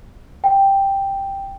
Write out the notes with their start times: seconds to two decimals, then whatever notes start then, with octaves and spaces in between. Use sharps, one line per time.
0.44 G5